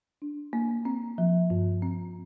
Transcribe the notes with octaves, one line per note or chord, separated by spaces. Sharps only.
D4
A#3
C4
F3
G2
C4